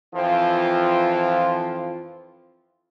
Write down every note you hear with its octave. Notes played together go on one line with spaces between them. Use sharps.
F2 E3 F3 C4 F4